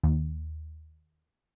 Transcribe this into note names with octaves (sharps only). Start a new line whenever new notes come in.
D#2